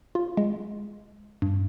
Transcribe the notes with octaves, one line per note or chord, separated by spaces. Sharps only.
F4
G#3
G2